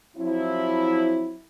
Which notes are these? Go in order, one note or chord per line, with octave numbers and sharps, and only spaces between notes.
F3 F#3 C4 E4